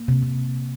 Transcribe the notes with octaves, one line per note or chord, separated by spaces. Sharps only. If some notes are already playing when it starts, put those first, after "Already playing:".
Already playing: A#3
C3
C3